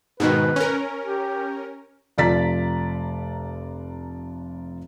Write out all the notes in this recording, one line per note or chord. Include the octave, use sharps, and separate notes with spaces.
G#2 B2 D#3 B4
C#4 A#4
G4
F1 F4 D5 A#5 A6 B6